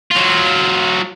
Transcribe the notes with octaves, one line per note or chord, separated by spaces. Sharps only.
F#3 F4